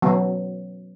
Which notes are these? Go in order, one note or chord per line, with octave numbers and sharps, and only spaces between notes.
F#3 B3